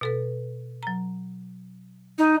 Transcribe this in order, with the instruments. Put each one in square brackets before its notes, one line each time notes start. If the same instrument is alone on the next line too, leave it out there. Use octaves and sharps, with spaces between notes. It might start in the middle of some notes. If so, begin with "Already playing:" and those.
[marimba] B2 A4 B4
F#3 A#5
[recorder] D#4